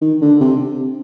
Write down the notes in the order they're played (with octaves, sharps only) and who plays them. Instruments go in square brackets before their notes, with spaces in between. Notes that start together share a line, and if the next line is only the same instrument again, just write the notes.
[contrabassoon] D#3
D3
C3